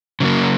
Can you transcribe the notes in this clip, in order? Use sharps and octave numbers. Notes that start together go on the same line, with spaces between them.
C#3 F#3 A#3